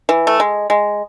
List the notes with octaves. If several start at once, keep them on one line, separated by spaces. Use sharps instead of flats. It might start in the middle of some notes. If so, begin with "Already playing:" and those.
E3
A3
G#3
G#3